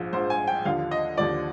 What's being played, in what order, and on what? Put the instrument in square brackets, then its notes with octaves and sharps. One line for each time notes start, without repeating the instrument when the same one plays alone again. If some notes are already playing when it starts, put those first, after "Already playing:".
Already playing: [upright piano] A#1 G#2 F3
A#1 G#2 F3 C5
G#5
G5
D#2 D3 F3 F5
D#5
D#2 D3 F3 D5